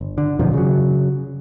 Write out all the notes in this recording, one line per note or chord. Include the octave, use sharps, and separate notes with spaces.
G1
D3
F#2 B2 D#3 F3
C#3 F#3